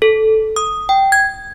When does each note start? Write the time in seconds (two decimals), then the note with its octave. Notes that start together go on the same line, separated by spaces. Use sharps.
0.02 A4
0.56 D#6
0.89 G5
1.12 G#6